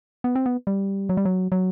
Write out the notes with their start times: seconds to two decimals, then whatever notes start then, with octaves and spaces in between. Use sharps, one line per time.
0.24 B3
0.36 C4
0.46 B3
0.67 G3
1.09 F#3
1.17 G3
1.25 F#3
1.52 F#3